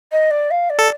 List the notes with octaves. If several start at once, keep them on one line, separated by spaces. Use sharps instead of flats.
D#5
D5
F5
D5
A4